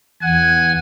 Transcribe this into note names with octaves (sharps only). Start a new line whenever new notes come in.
E2 F#5 G#5